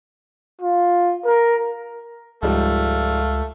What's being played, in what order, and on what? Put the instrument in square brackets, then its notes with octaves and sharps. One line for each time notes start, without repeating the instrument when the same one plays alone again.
[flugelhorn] F4
A#4
[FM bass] C#2 [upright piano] G#2 F3 G3 [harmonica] A3 [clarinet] F5